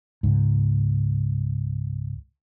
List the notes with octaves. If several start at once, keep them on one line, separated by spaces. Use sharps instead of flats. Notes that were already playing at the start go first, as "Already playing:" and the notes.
C#2 G#2